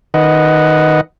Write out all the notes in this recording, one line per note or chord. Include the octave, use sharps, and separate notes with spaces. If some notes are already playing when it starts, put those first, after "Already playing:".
D#3 B4 D#5 F#5